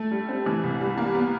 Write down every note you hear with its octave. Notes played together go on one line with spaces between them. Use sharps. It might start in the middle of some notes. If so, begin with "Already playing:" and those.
Already playing: A3
G3
C4
E3
C2
G3
A#3
B3